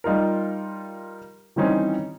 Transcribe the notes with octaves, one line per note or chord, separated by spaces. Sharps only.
G3 D#4 F4 A#4
D#3 E3 G3 C4 C#4 D#4